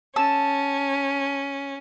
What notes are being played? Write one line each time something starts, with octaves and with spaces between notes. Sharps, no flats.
C#4 A5 E6